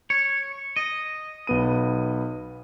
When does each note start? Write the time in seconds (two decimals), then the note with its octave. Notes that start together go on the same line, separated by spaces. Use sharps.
0.10 C#5
0.76 D#5
1.47 B1 B3 D#7